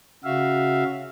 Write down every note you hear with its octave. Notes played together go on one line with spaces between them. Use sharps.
C#3 F#4 E5 F5